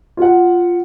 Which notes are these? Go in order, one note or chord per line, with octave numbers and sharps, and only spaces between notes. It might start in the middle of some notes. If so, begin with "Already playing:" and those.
F4 F#5